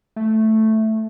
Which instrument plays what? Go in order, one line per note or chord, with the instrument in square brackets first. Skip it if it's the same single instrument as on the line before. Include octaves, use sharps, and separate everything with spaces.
[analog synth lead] A3